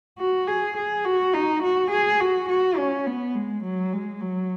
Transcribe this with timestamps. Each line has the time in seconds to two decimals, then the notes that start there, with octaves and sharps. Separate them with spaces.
0.19 F#4
0.48 G#4
0.77 G#4
1.05 F#4
1.34 D#4
1.63 F#4
1.91 G#4
2.20 F#4
2.49 F#4
2.77 C#4
3.06 B3
3.34 G#3
3.63 F#3
3.93 G#3
4.21 F#3